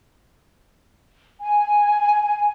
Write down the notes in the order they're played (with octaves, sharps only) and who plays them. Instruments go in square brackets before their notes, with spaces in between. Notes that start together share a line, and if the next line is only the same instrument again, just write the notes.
[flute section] G#5